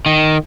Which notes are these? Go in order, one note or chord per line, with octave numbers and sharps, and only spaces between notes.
D#3